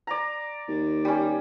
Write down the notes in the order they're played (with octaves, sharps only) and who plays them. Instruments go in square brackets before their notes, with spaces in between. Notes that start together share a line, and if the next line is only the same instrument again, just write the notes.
[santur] D5 A#5
[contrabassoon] D#2
[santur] G3 C#4